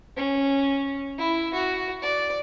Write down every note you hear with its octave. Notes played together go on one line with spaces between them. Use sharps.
C#4
E4
F#4
D5